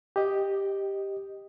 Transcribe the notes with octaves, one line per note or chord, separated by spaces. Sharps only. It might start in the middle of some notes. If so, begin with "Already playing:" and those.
G4 D#5